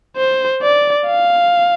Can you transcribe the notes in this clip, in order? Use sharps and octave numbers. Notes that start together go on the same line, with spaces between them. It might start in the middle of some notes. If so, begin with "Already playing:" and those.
C5
D5
F5